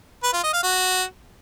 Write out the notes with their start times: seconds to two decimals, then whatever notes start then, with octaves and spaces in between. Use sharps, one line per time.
0.24 B4
0.34 F4
0.43 D#5
0.53 F5
0.63 F#4